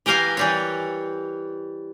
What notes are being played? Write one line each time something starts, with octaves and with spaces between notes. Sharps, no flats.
E3 G4 A#4 F5 G#5
E3 G3 C#5